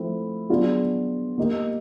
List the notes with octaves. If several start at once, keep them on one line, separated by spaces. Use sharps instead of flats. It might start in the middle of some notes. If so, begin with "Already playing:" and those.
Already playing: F3 A3 C4 E4
F#3 B3 D4 F4 G#4
A#3 D#4 G4